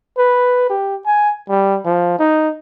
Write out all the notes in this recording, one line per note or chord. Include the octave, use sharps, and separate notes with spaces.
B4
G4
G#5
G3
F3
D#4